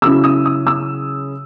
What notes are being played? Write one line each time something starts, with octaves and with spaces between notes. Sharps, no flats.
C#3 F#3 C#4 E4 E6
D#6
D#6
E6